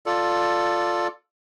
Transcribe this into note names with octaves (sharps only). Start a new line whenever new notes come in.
F4 A4 D5